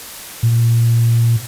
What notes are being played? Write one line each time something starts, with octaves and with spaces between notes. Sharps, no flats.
A#2